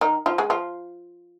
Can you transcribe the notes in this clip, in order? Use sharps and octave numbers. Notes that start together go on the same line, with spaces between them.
D#3 D#4
F3 F4
G#3 G#4
F3 F4